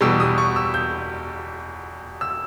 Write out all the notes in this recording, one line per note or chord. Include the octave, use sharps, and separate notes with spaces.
E2 B2 G3 E6
D#6
C#6
E6
G6
E6